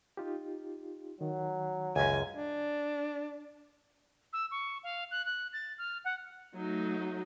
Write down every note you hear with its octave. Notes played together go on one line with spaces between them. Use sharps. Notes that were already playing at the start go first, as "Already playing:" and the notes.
D#4 F4 G4
D#3 F#3
C#2 F#2 G#5
D4
E6
C#6
F5
F#6
F#6
A6
F6
F#5
F#3 A3 D#4